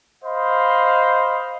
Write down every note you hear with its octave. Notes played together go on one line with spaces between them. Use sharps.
C5 D#5 F5 B5